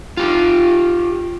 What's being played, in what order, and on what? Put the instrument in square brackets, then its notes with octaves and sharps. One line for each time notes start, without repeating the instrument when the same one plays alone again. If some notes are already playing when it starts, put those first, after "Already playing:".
[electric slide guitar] F4 G4